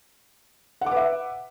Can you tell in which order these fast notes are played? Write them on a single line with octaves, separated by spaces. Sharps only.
F#5 D6 B4 E5